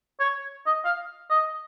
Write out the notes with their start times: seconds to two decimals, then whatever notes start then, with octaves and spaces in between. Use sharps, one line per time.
0.20 C#5
0.67 D#5
0.85 F5
1.30 D#5